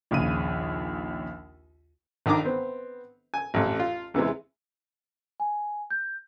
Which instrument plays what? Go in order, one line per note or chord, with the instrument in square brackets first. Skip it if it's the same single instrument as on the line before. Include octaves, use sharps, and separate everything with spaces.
[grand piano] A#1 D#2 C#3 D#7
[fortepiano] A#1 D#3 D4 A#5 D6
B3 C4
G#5
A1 F2
F4
E2 C3 E3 G#3
[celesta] G#5
G6